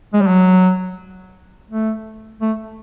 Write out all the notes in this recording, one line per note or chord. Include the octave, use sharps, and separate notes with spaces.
G#3
G3
F#3
A3
A3